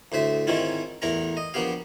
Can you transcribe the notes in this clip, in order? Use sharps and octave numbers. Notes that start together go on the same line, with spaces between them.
D2 A2 C5 E5
G#2 D#3 C4 C#4 E4 F4
A1 E2 E4 A#4 A#5
D#5
A#1 A#3 B3 G4 F5